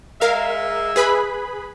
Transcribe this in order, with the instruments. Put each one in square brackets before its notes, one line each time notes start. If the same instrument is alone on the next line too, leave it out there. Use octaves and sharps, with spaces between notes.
[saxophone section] G#3 E5 [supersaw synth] A#4 F5
[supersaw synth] G#4 B4 B5